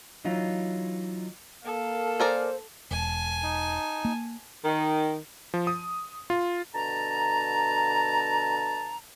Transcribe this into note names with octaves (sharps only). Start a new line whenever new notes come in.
E3 F#3 D#4 F4
A#3 A4 F5
G#4 A#4 C5 D5
E1 G#5 A5
D#4
A#3
D#3
F3
D#6
F4
B2 D3 A5 A#5